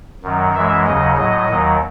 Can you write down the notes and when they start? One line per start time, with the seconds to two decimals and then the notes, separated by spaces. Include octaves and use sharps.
0.23 F#2 D#3 F#3
0.54 F#2 E3 G#3 E5
0.86 D#2 C#3 F#3 D#5
1.18 A2 F#3 D#5
1.49 D#2 D#3 F#3